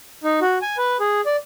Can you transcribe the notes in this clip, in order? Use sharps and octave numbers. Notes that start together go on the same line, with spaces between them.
D#4
F#4
G#5
B4
G#4
D5